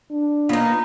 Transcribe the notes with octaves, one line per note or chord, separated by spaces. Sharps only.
D4
A#3 B3 D#4 F4